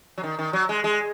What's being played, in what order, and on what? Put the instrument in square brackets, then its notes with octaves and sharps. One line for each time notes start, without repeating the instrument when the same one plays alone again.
[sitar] F#3
D#3
D#3
F#3
G#3
G#3